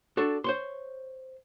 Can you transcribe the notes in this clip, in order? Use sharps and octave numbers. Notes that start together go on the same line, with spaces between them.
D4 F#4 A4
C5 C#5 C6